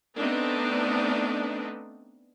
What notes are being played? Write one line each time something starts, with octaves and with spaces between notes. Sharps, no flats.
A3 B3 C4 D4 D#4